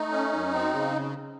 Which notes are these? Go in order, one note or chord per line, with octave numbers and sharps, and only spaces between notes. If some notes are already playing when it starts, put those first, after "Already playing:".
Already playing: A3 D#4
C#4
F#2
C4
C#3